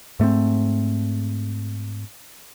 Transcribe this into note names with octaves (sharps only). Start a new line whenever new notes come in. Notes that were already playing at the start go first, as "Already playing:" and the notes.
G#2 A3 A#3 C4